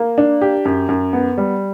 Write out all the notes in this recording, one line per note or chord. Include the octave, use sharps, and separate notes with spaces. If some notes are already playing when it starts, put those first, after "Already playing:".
Already playing: A#3
D4
G4
F#2
F#2
B3
G3